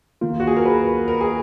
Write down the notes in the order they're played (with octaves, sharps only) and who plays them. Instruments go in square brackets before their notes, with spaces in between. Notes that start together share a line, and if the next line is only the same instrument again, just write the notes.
[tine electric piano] D#3 A#3 F4
[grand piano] F#4
G#4
A#4
B4
A#4
G#4